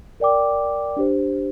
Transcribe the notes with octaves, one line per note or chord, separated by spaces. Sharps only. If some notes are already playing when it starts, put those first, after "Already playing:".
A#4 D5 G5 D6
D4 G4 C5